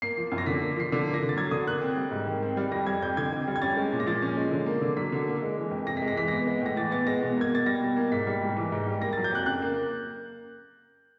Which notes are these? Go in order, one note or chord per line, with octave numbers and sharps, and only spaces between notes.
A#3 C7
F3
F#2
A#6
D3 B6
A#3
F3 C7
D3 B6
A#3
A#6
D3
A6
F#3 G#6
D3 D#6
A#3 F#6
C4
G3
G#2
D#3
C4
G3
F2 A#6
G3 G#6
F2 G6
D3 G#6
F2
G3
G#6
C#4 A6
G#3
A#2
A#6
F3 A6
C#4
G#3
D3
A#3
D3
F#3 B6
D3
A#3
G#3
E3
F2
C3 A#6
G#3 B6
A#6
E3 B6
B3 A#6
G#3
A2 A#6
E3 A6
B3 A6
G#3 A#6
B2
A#3 G#6
B2 A6
G3 A#6
B2
A#3
G#2 B6
G3
G#2
E3
G#2
G3
A#3 A#6
A6
F#3
G6
F2 F#6
C#3 F#6
A#3